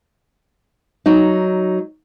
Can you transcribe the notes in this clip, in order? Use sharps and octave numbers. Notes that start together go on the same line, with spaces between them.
F#3 D#4